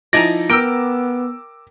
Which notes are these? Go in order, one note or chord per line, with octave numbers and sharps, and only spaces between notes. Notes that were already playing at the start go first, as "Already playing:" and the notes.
F3 D#4 E4 D5 G#5 A#5 A#6
B3 A#4 G5 D6 E6 D7